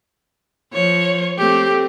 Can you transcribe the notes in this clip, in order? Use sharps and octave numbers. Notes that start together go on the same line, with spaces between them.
F3 C#5
A3 C4 G4